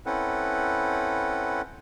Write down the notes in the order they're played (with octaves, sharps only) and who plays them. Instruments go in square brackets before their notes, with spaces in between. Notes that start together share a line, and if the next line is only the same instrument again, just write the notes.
[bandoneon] C4 C#4 E4 A4 B4 F#5